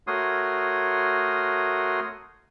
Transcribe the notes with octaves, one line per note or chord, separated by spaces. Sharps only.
A3 F#4 A#4 C#5 C6 D#6